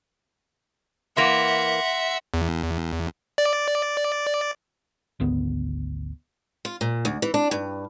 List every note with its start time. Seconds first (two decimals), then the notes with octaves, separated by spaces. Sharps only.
1.17 E3 A#3 E5 F#5 C6 A#6 F7
2.34 E2
3.38 D5
5.20 G#1 D2 B3
6.65 F4
6.81 A#2
7.05 D2
7.22 E3
7.34 D4
7.51 G2